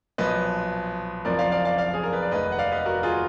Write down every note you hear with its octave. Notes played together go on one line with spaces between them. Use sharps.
B1 A#2 F3 B4 D#5
F#1 F2 F3 A#4 D5
D5 F5
D5 F5
D5 F5
D5 F5
G#4
A#4
B4
D5
F1 D#2 D#3 B4 D#5
F#5
D5 F5
B4 D#5
F#4 A#4
F4 G#4